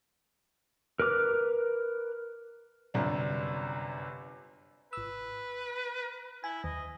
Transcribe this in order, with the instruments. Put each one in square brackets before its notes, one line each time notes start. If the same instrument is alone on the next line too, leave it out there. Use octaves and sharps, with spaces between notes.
[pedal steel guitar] A#4 B4 D6 F6
[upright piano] G1 F#2 C3 D4
[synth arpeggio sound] G#1 E6 [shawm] B4
[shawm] E4 [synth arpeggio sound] G#5
[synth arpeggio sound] D#2 [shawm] D#5